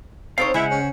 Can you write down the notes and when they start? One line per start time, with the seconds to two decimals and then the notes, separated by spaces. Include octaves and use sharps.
0.38 C4 D#4 A4 C5 C#5 F5
0.54 C#3 G#3 E4 C5 F#5
0.71 C#4